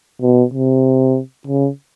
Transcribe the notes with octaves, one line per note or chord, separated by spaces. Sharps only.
B2
C3
C#3